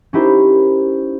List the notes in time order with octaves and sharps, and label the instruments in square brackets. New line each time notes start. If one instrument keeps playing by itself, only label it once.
[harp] C#4 D#4 E4 G4 A#4 C5